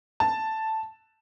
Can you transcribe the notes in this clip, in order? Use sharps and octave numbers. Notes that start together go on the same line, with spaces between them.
A5